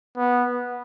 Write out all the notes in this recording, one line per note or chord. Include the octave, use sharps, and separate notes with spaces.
B3